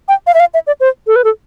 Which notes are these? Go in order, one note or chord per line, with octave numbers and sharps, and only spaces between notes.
G5
F5
E5
F5
E5
D5
C5
A4
B4
A4